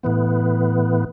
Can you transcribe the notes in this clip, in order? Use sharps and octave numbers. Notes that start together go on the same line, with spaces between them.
A2 E3 B3